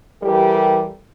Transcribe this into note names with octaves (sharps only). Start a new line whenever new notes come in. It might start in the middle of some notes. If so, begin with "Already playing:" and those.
E3 G3 G4 A4 A#4